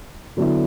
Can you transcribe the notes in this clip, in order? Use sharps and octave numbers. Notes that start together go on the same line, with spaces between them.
D3 F#3 B3 E4